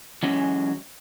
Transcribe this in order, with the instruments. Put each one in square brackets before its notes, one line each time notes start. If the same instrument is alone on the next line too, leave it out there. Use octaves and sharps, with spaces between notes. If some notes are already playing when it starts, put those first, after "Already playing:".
[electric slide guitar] E3 F#3 G#3 C#4